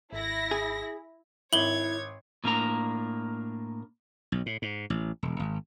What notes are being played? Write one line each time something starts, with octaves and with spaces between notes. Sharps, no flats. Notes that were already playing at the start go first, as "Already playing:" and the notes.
G#1 E4 A#6
G#4
G#1 E4 C#5 G#6 F#7 G7
A2 A#3 D4 A#5
B1
A2
G#2
A1
E1
G#1